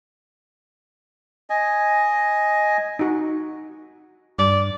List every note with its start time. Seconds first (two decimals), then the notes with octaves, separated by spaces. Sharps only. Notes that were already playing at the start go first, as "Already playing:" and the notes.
1.50 D#5 G#5
2.99 D#4 F#4
4.39 G2 D5